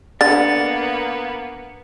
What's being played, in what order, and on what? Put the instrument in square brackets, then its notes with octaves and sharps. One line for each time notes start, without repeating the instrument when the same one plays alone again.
[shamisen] D3 [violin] A#3 B3 [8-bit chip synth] A6